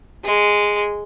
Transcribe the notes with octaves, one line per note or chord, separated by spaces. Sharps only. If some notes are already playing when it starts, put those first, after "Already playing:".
G#3